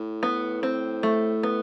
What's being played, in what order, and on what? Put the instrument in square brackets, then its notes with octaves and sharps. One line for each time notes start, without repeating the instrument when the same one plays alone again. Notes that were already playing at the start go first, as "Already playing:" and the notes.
Already playing: [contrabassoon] A2
[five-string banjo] B3
C4
A3
B3